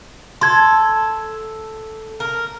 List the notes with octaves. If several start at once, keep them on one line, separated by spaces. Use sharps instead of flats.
A4 C6 G#6
A#4